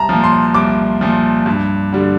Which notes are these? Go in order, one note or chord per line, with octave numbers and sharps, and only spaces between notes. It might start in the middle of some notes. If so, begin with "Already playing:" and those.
Already playing: C2 A5 A#5
A#2 F3
C6
C2 D6
A#2 F3
G2
D3 G3